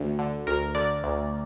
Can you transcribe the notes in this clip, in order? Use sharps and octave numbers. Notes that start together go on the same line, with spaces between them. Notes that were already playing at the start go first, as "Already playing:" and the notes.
Already playing: D2 D3
D3
D2 A#4
D3 D5
D2